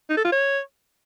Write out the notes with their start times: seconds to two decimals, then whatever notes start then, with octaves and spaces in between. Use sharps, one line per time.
0.10 D#4
0.17 A4
0.25 F4
0.32 C#5